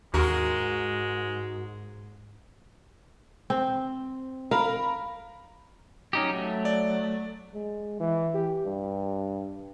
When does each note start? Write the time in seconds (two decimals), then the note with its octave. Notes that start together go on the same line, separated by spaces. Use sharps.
0.14 D#2 G#2 G#3 F#4 A#4
3.50 C4
4.51 A#4 F5 B5
6.13 F#3 C#4 D#4 G4
6.33 A3
6.65 D5
7.54 G#3
8.00 E3
8.34 G4
8.66 G2